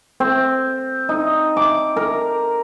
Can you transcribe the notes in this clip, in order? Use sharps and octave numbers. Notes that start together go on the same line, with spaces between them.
C4
D#4
D6
A#4